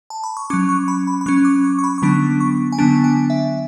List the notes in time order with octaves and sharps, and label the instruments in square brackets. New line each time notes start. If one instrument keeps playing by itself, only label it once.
[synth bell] A5
B5
C#6
F#3 C#4 D6
C#6
B5
B5
B5
F#3 C#4 C#6
D6
C#6
C#6
B5
C#6
D3 F#3 B3 D4 B5
C#6
G#5
D3 F#3 B3 D4 A5
G#5
E5